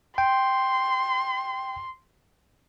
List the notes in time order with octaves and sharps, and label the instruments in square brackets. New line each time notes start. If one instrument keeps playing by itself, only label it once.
[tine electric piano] G5 [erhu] C6